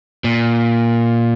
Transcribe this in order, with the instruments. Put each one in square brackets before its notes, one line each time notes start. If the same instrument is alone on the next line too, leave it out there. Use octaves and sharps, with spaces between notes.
[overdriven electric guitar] A#2